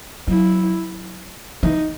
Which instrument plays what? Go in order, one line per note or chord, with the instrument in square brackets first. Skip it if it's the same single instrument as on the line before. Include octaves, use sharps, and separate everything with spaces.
[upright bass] F#3 [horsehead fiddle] E4
[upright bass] E3 [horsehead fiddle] D#4